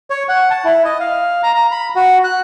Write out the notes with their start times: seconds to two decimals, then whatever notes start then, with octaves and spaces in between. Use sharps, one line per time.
0.10 C#5
0.29 F#5
0.51 A5
0.64 E4
0.85 D#5
1.00 F5
1.43 A#5
1.55 A#5
1.71 B5
1.95 F#4
2.24 F#6